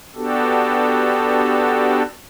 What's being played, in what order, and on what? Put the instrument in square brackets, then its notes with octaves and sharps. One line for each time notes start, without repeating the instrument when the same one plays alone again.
[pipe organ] B3 D4 F#4 G4 A4